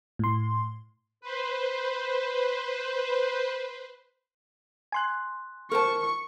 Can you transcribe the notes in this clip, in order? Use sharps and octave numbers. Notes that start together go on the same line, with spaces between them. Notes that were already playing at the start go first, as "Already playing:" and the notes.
A2 C6
B4 C5
G#5 C6 F#6
A#4 C5 A5 C#6